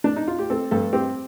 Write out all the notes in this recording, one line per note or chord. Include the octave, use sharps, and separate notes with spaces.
D4
D#4
F4
G4
C4 A4
G2 A4
C4 G4